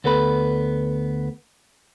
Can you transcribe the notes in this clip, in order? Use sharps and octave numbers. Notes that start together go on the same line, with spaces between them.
D2 B3 A4 B4 B5